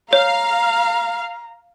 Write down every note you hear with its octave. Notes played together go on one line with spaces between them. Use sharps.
C#5 F5 A#5